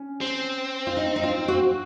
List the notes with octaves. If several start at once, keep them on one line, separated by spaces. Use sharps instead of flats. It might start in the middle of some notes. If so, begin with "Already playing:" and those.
Already playing: C#4
C4
F4
D#4
D#4
F4
F#4